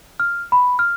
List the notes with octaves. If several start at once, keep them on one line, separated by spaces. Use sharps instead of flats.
F6
B5
F6